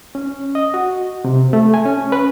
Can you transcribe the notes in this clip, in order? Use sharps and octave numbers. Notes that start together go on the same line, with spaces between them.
C#4
D#5
F#4
C3
A3
G#5
C#4
B4